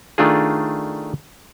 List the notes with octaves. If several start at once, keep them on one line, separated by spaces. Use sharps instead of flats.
D#3 A3 D4 F4 G#4